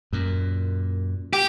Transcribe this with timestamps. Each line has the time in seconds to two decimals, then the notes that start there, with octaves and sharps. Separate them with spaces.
0.13 F#2 A#2
1.33 G4